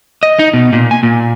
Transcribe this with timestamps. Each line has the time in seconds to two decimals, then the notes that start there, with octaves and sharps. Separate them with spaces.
0.23 D#5
0.39 D#4
0.54 B2
0.73 A#2
0.91 G#5
1.03 A#2